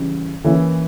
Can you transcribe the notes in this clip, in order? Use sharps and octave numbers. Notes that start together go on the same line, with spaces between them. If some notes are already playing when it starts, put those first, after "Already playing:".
Already playing: C#3 E3 G3
E3 A#3 C#4 E4